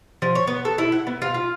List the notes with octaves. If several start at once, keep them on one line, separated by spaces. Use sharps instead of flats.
F3
C#5
B3
A4
E4
F#5
B3
F4
F4